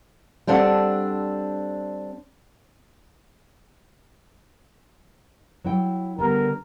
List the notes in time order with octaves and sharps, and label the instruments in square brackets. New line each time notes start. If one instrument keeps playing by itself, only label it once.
[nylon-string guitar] G3 C4 D4 A4 F#5
F#3 E4 G5
[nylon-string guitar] D3 G3 B3 [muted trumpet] A#4